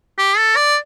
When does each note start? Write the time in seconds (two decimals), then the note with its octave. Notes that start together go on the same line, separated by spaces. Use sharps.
0.19 G4
0.38 A4
0.56 D5